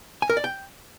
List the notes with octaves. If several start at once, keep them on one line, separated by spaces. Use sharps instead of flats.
G#5
A#4
D5
G5